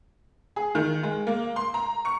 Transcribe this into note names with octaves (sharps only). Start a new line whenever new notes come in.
G#4
D#3
G#3
A#3
C6
A#5
C#6